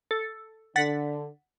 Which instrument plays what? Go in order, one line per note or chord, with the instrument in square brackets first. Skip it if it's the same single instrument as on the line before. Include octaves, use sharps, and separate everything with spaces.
[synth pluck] A4
[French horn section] D3 [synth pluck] F#5 A6 B6